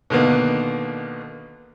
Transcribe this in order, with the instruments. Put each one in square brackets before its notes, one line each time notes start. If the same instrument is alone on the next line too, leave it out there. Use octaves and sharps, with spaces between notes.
[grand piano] B2 D3 D#3 A#3 B3